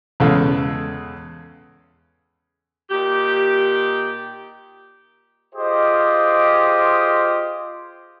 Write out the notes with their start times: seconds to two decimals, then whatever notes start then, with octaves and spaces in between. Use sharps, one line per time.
0.20 E2 C#3 G#3 A4 F5
2.90 A#2 D#4 G4
5.55 F4 G4 G#4 C5 D#5